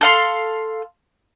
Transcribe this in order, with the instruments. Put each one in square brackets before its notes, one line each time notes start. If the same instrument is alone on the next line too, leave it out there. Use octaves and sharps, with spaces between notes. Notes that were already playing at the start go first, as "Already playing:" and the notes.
[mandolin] A4 F5 C6